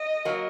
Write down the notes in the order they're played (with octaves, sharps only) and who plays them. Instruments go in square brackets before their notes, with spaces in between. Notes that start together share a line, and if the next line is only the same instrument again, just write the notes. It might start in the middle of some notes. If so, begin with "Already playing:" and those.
Already playing: [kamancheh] D#5
[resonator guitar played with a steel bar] F#3 A#3